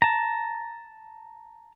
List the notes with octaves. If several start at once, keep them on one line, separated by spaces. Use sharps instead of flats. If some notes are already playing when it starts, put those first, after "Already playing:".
A5 A#5